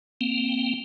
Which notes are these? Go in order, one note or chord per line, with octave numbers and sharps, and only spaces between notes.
A#3 C4